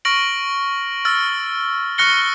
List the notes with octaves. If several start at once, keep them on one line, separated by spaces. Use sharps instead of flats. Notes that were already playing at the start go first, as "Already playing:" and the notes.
C#6 F6 A#6 D7 F#7
E6 F6 A6
C#6 F6 F#6 A#6 C#7 G7